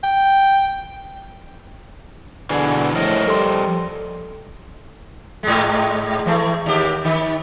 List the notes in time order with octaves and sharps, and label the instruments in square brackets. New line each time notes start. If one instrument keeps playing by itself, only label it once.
[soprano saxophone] G5
[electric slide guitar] B2 E3 G#4 [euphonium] D3
[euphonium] A2 [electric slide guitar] F3 A#4 D#5
[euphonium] G3 [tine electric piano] A4 C6
[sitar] G#2 G#3
E3 A3
D#2 G4
D#3